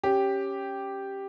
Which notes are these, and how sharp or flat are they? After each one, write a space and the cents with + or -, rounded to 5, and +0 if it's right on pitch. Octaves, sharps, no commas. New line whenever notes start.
C#4 -5 G4 +0